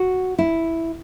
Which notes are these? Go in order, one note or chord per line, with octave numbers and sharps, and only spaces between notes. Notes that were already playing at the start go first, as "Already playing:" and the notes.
Already playing: F#4
E4